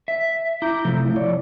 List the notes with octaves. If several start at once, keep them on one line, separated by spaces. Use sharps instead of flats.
E5
E4 A#5 D6 G6
C3 F3 A3 E4
C#5 D5